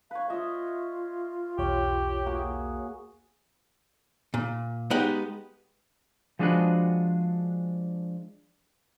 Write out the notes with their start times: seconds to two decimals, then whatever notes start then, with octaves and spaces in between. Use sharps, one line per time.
0.11 B4 C#5 F5
0.30 F4 D#5 E5
1.58 B1 E2 G4 C#5
2.26 A#3 F#4 G#4
4.34 A#2
4.90 G#3 B3 D#4 G4 F#5
6.39 F3 G#3 D4 F#4 G#4 B4